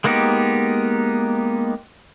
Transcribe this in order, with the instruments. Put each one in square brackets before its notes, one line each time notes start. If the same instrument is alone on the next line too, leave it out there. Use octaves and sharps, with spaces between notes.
[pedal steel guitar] G#3 A#3 B3 D#4 G4